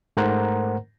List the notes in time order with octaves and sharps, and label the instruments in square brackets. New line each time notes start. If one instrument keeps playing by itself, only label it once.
[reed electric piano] G#2 A3 A#4 C5 F#5 A#5